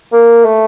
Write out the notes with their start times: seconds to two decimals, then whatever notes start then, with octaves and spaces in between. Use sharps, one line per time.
0.13 A#3
0.45 A3